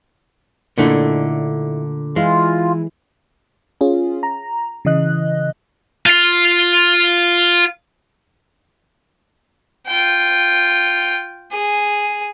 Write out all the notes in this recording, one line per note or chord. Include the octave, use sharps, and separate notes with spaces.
A#2 D3 A3 D#4 E4
E3 G#3 F4
C#4 F4 G#4
A#5
C#3 E3 D#5 F#6
F4 F5
F4 G5
G#4